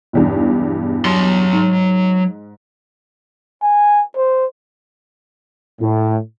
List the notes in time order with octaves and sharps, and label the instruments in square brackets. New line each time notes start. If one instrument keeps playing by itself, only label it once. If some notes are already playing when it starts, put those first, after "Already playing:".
[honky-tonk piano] B1 E2 G2
[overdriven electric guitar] F#3 C6
[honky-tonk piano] G#2
[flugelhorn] G#5
C5
[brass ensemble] A2